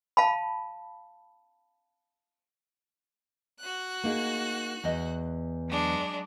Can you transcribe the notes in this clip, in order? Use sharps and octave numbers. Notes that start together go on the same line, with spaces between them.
F5 A5 B5
F#4 F#6
A#3 D#4 G#4
E2 D#5
F#3 G#3 D4